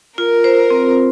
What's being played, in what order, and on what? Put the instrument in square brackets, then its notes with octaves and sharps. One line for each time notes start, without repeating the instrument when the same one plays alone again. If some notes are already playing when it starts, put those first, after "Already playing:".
[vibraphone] F4 [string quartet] A#4
[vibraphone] C5
C4